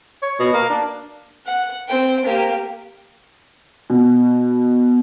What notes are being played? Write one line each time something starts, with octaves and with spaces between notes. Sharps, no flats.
C#5
B2
A#3
D4
F#5
C4 G5
A#3 G4
B2